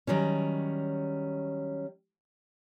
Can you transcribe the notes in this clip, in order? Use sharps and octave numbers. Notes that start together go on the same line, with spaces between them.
D#3 F#3 G3 C#4